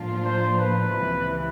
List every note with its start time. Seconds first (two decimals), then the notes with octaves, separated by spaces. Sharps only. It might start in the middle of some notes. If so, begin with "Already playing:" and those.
Already playing: A2 F3 A#3 D4 F4
0.25 C5
0.58 B4
0.92 C#2 C3 E3